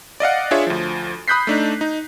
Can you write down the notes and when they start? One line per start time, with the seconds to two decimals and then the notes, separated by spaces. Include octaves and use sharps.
0.20 D5 D#5 F5 F#5
0.51 D4 F4 G#4 C#5 E5
0.67 D2 F3
1.28 B5 D#6 F#6 G6 B6 C7
1.47 A3 D4 D#4
1.81 D#4